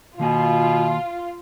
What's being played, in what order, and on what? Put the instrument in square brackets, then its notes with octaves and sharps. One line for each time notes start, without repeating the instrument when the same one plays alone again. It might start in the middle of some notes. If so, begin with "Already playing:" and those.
[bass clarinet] B2 [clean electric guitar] D#3 A#3 G#5 [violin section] F4